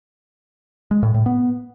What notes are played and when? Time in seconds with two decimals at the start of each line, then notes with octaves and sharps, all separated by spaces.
0.91 G#3
1.03 A2
1.14 A2
1.26 B3